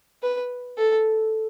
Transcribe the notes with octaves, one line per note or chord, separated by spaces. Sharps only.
B4
A4